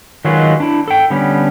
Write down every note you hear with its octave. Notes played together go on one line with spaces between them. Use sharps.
D#3 F#3 G#3 F4 F#4 B4
D4 E4
A4 G5
D3 G3 B3 C#4